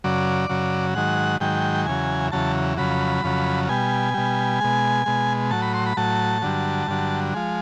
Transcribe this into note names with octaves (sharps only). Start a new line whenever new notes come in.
F#2 C#3 F#3 D5
F#2 C#3 F#3
G#2 D#3 F#3 F#5
G#2 D#3 F#3 G5
E2 C#3 F#3 G#5
E2 C#3 F#3 A5
F2 C#3 F#3 B5
F2 C#3 F#3
B2 G3 G#5
B2 G3
B2 G#3
B2 G#3
A2 F#3 A5
B5
C6
B5
A2 F#3 A5
G2 D3 F#3
G2 D3 F#3
F3 G#3